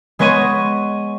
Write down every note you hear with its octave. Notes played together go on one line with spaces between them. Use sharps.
G#3 B3 C#5 D#5 C#6 D#7